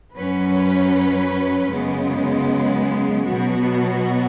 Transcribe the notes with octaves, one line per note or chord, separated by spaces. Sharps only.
F#2 F#3 C#4 B4
F#2 C#3 G#3 B3
B2 F#3 B3 F#4